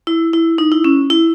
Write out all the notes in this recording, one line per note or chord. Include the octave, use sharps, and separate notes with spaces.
E4
E4
D#4
E4
C#4
E4